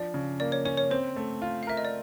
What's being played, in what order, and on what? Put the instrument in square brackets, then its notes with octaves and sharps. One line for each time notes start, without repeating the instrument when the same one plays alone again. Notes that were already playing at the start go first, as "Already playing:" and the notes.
Already playing: [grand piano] F3 D4 [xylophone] D5
[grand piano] C#3
[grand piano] A#3 [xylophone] D5
[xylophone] C#5
[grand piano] C#4 [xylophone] C#5
[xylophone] C#5
[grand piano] C4 [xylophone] C5
[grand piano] A3
F4
[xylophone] F5
[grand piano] A#4 [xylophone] E5
[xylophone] D#5
D5